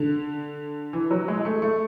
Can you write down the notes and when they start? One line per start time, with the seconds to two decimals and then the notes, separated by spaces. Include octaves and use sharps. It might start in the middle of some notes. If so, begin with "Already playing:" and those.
Already playing: D3
0.93 E3
1.11 F#3
1.28 G#3
1.45 A3
1.62 A3